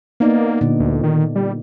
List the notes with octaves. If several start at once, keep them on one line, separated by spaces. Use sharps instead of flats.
A#3 B3 D#4 D5
A#2 D3
D2
D#3
G3